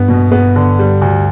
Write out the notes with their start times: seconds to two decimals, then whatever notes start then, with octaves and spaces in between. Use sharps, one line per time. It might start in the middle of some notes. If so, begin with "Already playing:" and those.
Already playing: G2 B3
0.09 B2
0.32 B3
0.56 D3
0.79 G3
1.02 D2